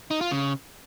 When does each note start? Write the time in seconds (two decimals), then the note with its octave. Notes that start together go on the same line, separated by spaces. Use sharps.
0.11 D#4
0.21 F4
0.31 C#3